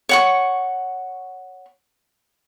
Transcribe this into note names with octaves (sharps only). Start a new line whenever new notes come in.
C#5 F#5 C#6